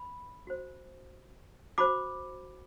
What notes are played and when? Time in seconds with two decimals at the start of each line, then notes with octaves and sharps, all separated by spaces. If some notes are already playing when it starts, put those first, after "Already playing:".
Already playing: B5
0.47 F#4 C5
1.78 F#4 C5 B5 D6